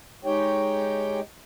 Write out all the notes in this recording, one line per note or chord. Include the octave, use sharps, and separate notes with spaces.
G#3 D#4 G4 C#5 G5